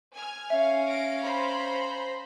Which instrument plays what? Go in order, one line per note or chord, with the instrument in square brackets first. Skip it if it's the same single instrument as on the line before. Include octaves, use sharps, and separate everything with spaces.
[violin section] G#5 F6 G#6
[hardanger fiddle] C#4 F5 [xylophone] E5
[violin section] A#6 D7
C5 A#5 B5